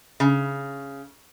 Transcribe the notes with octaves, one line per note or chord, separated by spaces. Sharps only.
C#3